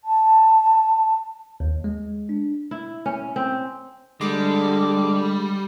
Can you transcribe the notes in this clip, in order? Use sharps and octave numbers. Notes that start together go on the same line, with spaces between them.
A5
D#2
G#3
D4
E4
C#4
C4
D3 G3 G#3 D6